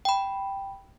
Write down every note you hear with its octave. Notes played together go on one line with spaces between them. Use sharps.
G5 B5